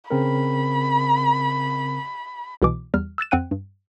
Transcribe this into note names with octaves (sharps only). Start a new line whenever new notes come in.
C#3 C4 A#4 B5
C2 B2 E3 D6
E2 G3 F6
E6 F#6 A6 E7
F2 C4 F#5 G5 F#6 D#7
G2